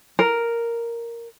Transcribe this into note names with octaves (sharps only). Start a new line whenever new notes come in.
A#4